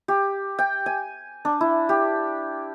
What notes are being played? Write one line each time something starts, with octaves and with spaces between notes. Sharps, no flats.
G4
G5
G#5
D4
E4
G4